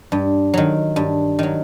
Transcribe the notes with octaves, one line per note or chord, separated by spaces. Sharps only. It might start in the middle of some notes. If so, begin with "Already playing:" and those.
G2
D#3 F#3
G2
D#3 F#3